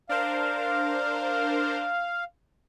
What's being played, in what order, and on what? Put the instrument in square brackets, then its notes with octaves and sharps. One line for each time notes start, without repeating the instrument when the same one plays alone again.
[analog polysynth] D4 A#4 C5 [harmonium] F5